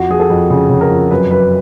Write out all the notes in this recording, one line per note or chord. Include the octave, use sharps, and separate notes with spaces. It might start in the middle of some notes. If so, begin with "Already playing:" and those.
Already playing: F2 F#4
F3 G#4
A4
F2
C#3 G#4
C#3
A#4
F2
F#2 B4
F#2 B4